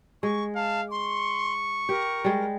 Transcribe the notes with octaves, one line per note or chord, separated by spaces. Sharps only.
G#3 C#6
F5 A5
C6 C#6
G4 A#4
G3 G#3